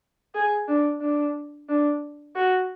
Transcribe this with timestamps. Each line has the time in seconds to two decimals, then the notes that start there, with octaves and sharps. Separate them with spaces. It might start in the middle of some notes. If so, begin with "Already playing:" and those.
0.35 G#4
0.68 D4
1.01 D4
1.69 D4
2.35 F#4